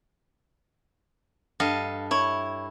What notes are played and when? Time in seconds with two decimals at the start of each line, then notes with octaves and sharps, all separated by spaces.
1.60 G2 A4 D#5 F5
2.11 E4 C#5